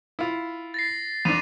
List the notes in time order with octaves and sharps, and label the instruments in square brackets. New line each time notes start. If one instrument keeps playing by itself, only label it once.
[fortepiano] E4 F4
[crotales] A6 A#6 C7
[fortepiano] F2 D4 [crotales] B6 D#7 F7